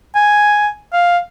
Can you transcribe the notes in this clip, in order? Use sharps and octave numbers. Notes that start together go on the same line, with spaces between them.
G#5
F5